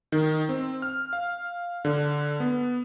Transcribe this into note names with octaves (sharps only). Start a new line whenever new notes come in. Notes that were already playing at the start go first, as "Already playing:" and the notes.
D#3
C4
F6
F5
D3
B3